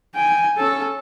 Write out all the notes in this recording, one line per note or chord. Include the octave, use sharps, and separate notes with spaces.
G5 G#5
C#4 A4